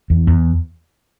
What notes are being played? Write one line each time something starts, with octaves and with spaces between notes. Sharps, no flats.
E2
E2